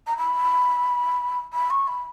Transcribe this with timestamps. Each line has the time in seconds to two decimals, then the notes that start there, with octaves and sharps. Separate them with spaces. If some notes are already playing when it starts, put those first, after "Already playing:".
0.07 A#5
0.17 B5
1.53 B5
1.70 C#6
1.87 B5